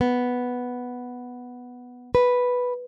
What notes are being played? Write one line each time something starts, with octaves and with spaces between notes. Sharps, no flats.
B3
B4